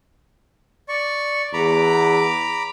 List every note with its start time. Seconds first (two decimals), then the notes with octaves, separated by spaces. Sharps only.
0.89 D5 C#6
1.53 E2 A#5 B5 D6